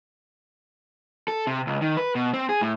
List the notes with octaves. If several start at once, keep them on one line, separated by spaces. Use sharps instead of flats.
A4
C3
C#2
D#3
B4
B2
C4
G#4
A2